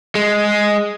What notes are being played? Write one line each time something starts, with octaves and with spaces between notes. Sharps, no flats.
G#3